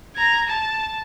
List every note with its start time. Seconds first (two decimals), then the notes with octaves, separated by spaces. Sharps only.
0.16 A#5 G#6
0.48 A5